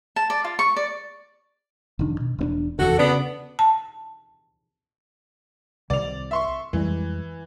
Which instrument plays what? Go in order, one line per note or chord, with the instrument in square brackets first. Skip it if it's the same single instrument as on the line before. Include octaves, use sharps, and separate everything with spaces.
[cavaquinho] A5
D5
F4
C#6
D5
[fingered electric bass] F1 D#3 D4
B2
E1 C4 D4
[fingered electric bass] F1 E2 D3 [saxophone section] F#4 A4
[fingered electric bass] C#3 [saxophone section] B3 D4
[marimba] A5
[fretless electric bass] C2 C3 D#3 [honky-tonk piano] D5 F7
[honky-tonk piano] E5 C6 C#6
[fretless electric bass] F2 G3 G#3 [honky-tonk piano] E3